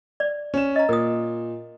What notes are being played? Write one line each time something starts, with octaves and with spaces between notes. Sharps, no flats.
D5
C#4 E7
D#5 A#5
A#2 A#4 D#6